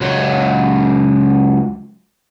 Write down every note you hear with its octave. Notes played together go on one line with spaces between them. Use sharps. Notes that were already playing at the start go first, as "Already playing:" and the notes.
C#2 F#3